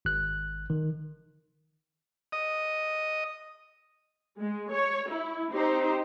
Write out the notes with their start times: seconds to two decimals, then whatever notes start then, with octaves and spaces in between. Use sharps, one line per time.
0.05 G#1 F#6
0.70 D#3
2.32 D#5
4.40 G#3
4.71 C#5
5.10 E4
5.52 C4 D#4 G4 C5